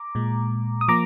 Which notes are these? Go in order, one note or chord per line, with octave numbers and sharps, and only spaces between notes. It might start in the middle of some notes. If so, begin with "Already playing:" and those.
Already playing: A#5 D6
A#2 G#3
D#6
F3 A#3 A#5 D6